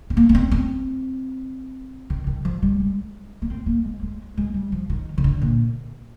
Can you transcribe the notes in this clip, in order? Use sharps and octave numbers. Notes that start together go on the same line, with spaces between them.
C4
A#3
A#3
C4
C4
D#3
D#3
F3
G3
G#3
A#3
C4
A#3
G#3
G#3
G#3
G3
F3
D#3
D#3
D3
A#2